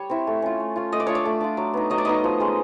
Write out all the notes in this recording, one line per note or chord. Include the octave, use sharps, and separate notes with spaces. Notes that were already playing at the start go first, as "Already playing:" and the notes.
Already playing: G3 C#5
C4 E4
A3
C#4 F4
A3
C#4 F4
A3 D#5
D5
D4 F4 C#5
D5
A3
D4 F4
F#3
B3 D#4
F#3 D#5
D5
B3 D#4 D#5
F3
G#3 C#4